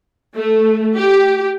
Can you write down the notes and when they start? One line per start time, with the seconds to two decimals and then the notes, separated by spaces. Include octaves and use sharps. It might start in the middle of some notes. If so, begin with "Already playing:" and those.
0.36 A3
0.97 G4